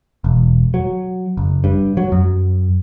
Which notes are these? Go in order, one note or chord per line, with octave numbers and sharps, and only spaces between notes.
E1
F#3
F#1
G2
F#3
F#2